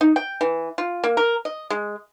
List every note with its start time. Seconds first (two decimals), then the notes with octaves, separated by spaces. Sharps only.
0.01 D#4
0.16 G5
0.41 E3
0.78 F4
1.04 A#3
1.17 A#4
1.45 D#5
1.70 G#3